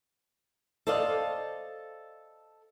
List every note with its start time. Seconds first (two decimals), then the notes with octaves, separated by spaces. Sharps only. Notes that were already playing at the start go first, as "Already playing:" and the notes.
0.87 A4 C5 D5 D#5 F5